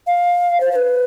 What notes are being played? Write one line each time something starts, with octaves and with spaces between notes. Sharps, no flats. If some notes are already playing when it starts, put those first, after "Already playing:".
F5
C5
C5
B4